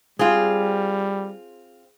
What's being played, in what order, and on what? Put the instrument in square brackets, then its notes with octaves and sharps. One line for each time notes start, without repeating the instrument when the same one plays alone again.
[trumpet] G3 [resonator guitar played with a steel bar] C4 F4 [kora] G#4